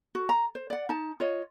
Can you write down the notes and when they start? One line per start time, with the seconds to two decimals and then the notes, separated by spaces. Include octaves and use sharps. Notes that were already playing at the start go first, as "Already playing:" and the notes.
0.15 F#4
0.29 A#5
0.55 C5
0.70 D5 F#5
0.89 D#4 A5
1.20 F4 C#5 D#5